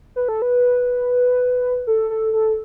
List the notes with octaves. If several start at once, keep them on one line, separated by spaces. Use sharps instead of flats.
B4
A4
B4
A4
A4
A4